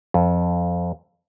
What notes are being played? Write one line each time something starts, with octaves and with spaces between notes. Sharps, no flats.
F2